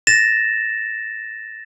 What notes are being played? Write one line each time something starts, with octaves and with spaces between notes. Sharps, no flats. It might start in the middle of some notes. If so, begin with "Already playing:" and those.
A6 A#6 E7